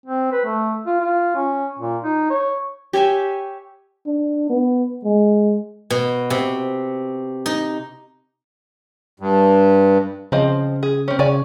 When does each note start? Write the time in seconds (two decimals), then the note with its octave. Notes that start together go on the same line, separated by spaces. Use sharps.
0.06 C4
0.32 B4
0.45 A3
0.87 F4
1.00 F4
1.35 C#4
1.79 A#2
2.04 D#4
2.30 C#5
2.93 G4 C#5 E5 G#5
4.06 D4
4.50 B3
5.05 G#3
5.90 B2
6.30 C3
7.46 D#4
9.20 G2
10.32 C#3 F3 C4 D#5
10.83 G#4
11.08 C4 C#4
11.19 C#3 C#5 D5 G#5